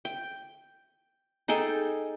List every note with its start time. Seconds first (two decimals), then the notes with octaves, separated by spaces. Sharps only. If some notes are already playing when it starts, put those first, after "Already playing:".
0.05 G5
1.48 D#4 G#4 A4 G5